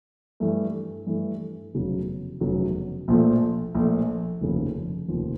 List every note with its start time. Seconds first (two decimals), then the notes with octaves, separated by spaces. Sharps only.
0.40 G2 E3 A3
1.07 G2 E3 A3
1.74 F1 E2 C#3 F#3
2.40 F1 E2 C#3 F#3
3.08 A#1 A#2 F3 A3
3.75 A#1 A#2 F3 A3
4.41 F1 D#2 C#3 F3
5.08 F1 D#2 C#3 F3